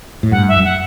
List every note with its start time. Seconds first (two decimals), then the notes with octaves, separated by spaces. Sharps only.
0.23 A2
0.32 G2 F#5
0.48 E5
0.56 F#2
0.65 F#5